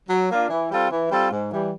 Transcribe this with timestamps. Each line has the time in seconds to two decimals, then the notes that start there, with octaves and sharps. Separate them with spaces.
0.09 F#3
0.30 A#3 D4 F4
0.50 E3
0.71 G3 C4 F4 A4
0.91 E3
1.11 G3 C4 F4 A4
1.32 G#2
1.51 E3 G3